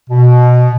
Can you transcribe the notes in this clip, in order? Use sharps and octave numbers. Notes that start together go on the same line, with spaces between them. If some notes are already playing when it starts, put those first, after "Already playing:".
B2